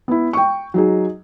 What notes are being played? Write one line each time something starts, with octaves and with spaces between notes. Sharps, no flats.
B3 E4
G5 C#6
F#3 D#4 G#4